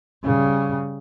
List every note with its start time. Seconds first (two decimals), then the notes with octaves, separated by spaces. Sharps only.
0.23 C#3 G3